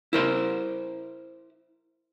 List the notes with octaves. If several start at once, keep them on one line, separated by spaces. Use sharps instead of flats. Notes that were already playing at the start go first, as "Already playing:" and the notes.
E4 A#4 C5